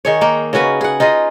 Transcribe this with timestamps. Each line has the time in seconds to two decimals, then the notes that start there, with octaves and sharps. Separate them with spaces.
0.05 D#3 G#4 C#5
0.21 A#3 D#4
0.53 C#3 C#4 F#4 B4
0.81 G#4 F#5
1.00 D#4 F4 G#4 D#5